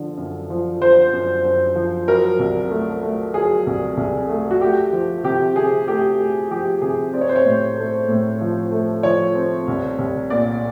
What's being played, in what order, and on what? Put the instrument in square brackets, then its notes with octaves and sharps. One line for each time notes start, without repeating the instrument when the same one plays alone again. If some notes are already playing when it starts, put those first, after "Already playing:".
Already playing: [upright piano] D3 F3
F#2
F3
F3 C5
F#2
F#2
F3
F#3 A#4
C2
A3
A3
F#3 G#4
C2
C2
A3
F#4
A3 G4
F3
C3 G4
C3 G#4
A3 G4
A3
F3 G4
C3 G#4
C4 D5
C#5
C5
C#5
A2
A3
A2
F3
A3
F3 C#5
C4
C2
C2
A#2 D5